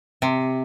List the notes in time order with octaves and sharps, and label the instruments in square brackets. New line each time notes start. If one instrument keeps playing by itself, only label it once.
[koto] C3